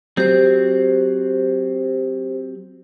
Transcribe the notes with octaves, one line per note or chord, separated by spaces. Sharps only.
F#3 C4 G4 C5